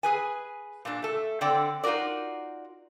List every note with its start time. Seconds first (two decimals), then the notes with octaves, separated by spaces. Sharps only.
0.03 G#4 B4 G#5
0.85 A#2 A#3 D4
1.02 A3 A4
1.41 D3 C4 D5 G5
1.84 D#4 F4 F#4 A#4 D5